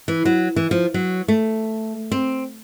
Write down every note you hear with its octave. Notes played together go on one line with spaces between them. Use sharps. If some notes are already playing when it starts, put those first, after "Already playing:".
E3
F#3
E3
F3
F#3
A3
C4